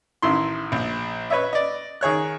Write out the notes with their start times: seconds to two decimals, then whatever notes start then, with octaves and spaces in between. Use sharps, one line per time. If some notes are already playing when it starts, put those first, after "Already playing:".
0.22 A1 D#3 E4 C6
0.72 A#1
1.30 B4 C#5 D#5 E5
1.53 D5 D#5
2.01 D#3 G#4 C#5 F#6